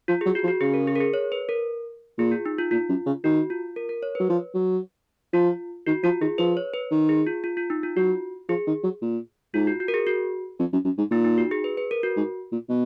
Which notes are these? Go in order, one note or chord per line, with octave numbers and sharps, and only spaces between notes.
F3 F4
G#4
F#3
F#4
F3
F#4
C#3 G#4
A#4
G#4
A#4
G#4
C#5
B4
A#4
A#2 G#4
F4
D#4
F4
A#2 F4
F#2
C#3
D#3 F#4
F4
A#4
A#4
C#5
F#3 B4
F3
F#3
F3 F4
D#3 F#4
F3 F4
D#3 G#4
F3 B4
C#5
B4
D#3
G#4
F4
F4
F4
D#4
F4
F#3 F#4
F3 G#4
D#3
F#3
A#2
G#2 F4
F#4
F#4
A#4
G#4
F#4
F2
F#2
F#2
G#2
A#2 D#4
D#4
F#4
G#4
B4
B4
A#4
F#4
G#2
A#2
B2